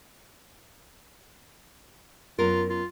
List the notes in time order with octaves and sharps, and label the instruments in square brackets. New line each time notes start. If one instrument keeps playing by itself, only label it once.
[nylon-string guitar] F#2 B3 A#4 [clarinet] F4
[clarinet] F4